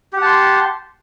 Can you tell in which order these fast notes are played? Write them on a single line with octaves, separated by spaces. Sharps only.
G4 F#5 A5 C6